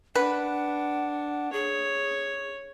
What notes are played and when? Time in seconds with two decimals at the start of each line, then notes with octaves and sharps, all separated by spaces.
0.15 D4 B4 F#5
1.53 G#4 C#5